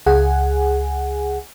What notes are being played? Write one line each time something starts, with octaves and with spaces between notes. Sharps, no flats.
C#2 G#4 F#5 G#5